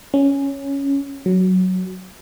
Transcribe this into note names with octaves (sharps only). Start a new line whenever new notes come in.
C#4
F#3